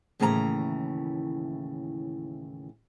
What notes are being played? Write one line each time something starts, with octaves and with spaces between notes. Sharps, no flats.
D#2 A2 C#3 E3 G#5 A#5